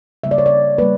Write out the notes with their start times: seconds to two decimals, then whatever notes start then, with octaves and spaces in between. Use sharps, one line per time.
0.23 C#3 G3 A#3 E5
0.31 D5
0.38 C#5
0.46 D5
0.78 G3 A#3 B4